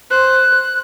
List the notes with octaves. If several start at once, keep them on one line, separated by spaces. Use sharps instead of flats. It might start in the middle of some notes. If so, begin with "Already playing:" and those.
C5 F#6